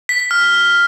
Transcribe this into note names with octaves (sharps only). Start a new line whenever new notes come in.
B6
B6
F6